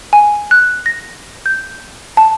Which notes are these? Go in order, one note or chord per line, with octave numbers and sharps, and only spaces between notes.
G#5
F#6
A#6
G6
A5